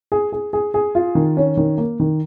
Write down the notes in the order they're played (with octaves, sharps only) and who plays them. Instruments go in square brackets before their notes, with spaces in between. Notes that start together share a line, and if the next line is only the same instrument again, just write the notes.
[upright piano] G#4
G#4
G#4
G#4
F4
D#3
C#4
D#3
A#3
D#3